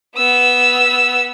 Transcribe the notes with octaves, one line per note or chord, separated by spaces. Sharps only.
B3 E6